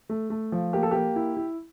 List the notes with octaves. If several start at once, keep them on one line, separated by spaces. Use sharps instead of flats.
A3
A3
F3
A#3 G4
A4
A#3 G4
E4
E4